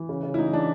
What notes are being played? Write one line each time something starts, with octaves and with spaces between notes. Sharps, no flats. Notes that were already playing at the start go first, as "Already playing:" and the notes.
Already playing: E3
C#3
C#3
E4
E3 D#4
E3 D4